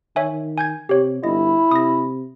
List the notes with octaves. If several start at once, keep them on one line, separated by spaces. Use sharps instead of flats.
D#3 C#5 E5 G#5
G#5 G6 G#6
C3 G4 C#5
G1 E4 D#5
C3 D#6 A#6